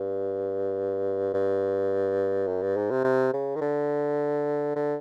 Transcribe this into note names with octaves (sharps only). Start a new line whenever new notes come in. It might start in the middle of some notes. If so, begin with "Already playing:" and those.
Already playing: G2
G2
F#2
G2
G#2
C3
C3
C#3
D#3
D3
D3